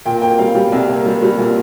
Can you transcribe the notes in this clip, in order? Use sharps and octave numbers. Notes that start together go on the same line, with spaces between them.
A#2 G5
A#3 G5
G3 F5
G3
C2
A#3
G3
G3
A#2